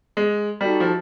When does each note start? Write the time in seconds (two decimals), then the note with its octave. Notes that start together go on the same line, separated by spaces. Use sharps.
0.17 G#3
0.60 G3 D#4 F#4 A4
0.80 F3